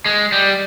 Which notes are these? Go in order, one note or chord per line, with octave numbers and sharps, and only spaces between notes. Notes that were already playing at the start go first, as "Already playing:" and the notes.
G#3
G3